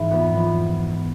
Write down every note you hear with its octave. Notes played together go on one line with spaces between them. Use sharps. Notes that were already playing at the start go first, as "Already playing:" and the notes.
Already playing: G#2 E3
F2 B3
F2